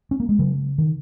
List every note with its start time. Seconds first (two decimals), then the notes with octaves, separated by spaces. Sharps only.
0.11 C#4
0.20 A#3
0.29 G#3
0.39 C#3 F#3
0.78 D#3